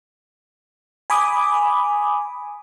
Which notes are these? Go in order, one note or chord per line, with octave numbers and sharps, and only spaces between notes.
G#5 B5 D6 D#6